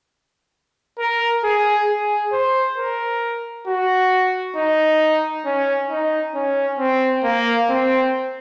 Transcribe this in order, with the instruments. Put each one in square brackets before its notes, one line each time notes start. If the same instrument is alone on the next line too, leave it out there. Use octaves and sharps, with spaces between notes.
[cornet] A#4
G#4
G#4
C5
A#4
F#4
D#4
C#4
D#4
C#4
C4
A#3
C4